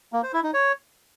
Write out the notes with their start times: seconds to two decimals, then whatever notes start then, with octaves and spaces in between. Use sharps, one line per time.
0.13 A#3
0.23 C5
0.33 E4
0.43 D#4
0.54 C#5